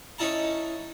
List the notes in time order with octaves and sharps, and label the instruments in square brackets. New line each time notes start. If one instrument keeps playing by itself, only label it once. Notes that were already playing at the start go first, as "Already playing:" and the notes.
[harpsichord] C#4 D#4 E4 A5 A#5